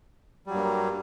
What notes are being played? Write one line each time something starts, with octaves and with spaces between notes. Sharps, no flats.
G2 F#3 G3 A#3